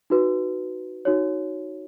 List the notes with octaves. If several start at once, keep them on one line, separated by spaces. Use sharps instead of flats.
D#4 F#4 B4
D#4 F#4 C#5